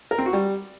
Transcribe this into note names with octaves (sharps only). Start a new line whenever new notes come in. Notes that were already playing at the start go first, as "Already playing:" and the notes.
A#4
C4
F#4
G3